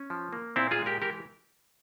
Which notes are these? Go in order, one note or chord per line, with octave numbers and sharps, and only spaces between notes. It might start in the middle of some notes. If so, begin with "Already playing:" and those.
Already playing: C#4
F3
A#3
A#2 C4 E4
F4 G#4
G#3
G4 A#4
E3 G4 A#4